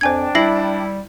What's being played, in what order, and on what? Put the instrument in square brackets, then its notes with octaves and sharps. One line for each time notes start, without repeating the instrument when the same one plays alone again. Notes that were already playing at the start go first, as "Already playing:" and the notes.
[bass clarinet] F2 [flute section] D4 G5 [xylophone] C5 G#5 G#6
[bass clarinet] G3 [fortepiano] E4 [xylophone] A#6 C7 F#7